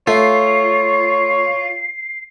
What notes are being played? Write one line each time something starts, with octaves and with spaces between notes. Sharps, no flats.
A3 F4 C#5 C7